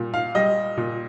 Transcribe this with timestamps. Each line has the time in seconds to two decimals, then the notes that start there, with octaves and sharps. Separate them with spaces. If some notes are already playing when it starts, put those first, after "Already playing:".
Already playing: A#2 G3
0.14 F5
0.35 G3 D#5
0.77 A#2